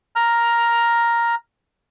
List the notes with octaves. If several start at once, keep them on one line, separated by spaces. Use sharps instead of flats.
A#5 F6